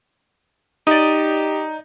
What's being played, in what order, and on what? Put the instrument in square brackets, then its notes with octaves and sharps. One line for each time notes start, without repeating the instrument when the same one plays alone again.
[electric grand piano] D#4 [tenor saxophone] G4 [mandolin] D5 D#5